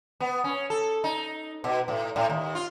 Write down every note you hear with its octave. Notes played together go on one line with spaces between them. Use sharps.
B3
C#4
A4
D#4
B2
A2
A2
D#2
F4